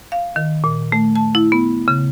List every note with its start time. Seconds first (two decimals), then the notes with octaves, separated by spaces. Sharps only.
0.12 F5
0.36 D#3
0.64 A#2
0.92 A3
1.16 A5
1.35 E4
1.52 B3
1.88 C#3